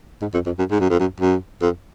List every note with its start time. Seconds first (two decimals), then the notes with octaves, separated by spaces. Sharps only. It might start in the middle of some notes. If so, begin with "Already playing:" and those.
0.22 G#2
0.34 F2
0.46 F2
0.59 F#2
0.71 G#2
0.80 F#2
0.90 F2
1.00 F#2
1.20 F#2
1.62 F2